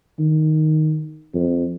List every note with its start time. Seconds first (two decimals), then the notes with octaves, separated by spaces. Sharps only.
0.19 D#3
1.35 F2